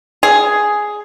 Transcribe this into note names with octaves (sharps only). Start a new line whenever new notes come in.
G#4